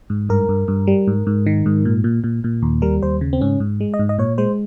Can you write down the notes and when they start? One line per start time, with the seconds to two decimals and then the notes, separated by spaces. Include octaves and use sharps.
0.10 G#2
0.29 G2 A#4
0.49 G2
0.68 G2
0.87 G3
1.08 G#2
1.27 G#2
1.46 D#3
1.66 G#2
1.85 A#2
2.04 A#2
2.24 A#2
2.44 A#2
2.62 D#2
2.82 G3 A#4
3.03 D#2 C5
3.21 C#3
3.33 C4
3.41 G#2 C#4
3.60 G#2
3.80 G#3
3.94 D#5
3.99 G#2
4.09 D#5
4.18 A#2 C#5
4.38 G#3 C5